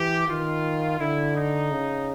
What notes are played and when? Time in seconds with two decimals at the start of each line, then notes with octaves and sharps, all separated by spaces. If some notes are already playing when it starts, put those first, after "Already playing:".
Already playing: E3 G4
0.28 D#3 F4
0.99 D3 E4
1.36 D#4
1.71 C#3